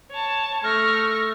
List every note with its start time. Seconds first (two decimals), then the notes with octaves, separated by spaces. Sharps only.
0.10 C#5 A5
0.64 A3 C#6 F6 A#6